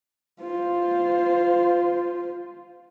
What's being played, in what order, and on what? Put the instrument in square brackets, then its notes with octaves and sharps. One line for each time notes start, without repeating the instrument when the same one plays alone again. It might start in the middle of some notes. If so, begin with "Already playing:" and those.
[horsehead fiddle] F4 C5